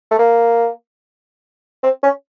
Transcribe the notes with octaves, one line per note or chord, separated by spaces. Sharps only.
A3
A#3
C4
C#4